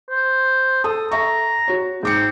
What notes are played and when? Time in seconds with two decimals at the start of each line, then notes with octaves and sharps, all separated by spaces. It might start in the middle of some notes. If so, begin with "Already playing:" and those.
0.09 C5
0.84 A4 D#6
1.11 A4 E5 A#5 C#6
1.68 F#4 C#5
2.03 G#2 C4 D6 C#7